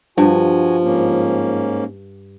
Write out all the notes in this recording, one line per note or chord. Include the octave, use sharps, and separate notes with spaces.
G2 F3 F#4 G#5
G#2 A#3 C#4